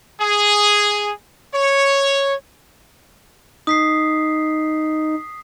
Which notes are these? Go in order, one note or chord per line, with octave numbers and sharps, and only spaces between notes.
G#4
C#5
D#4 D#6 B6 C7